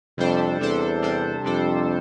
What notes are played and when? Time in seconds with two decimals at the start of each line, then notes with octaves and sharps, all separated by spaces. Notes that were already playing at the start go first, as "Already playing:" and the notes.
0.18 F2 C3 G3 D4 A4 C5
0.60 E2 C3 G3 D4 A4 C5
1.02 C3 G3 D4 A4 C5
1.44 F2 C3 G3 D4 A4 C5